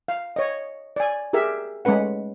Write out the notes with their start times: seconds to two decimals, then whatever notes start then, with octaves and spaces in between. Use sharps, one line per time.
0.08 F5
0.36 C#5 D#5
0.96 D5 G#5
1.33 G4 G#4 A#4 E5
1.85 G#3 A3 C#4 B4 F#5